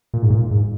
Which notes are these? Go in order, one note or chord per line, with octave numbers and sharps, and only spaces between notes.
A#2
G#2
A#2
G#2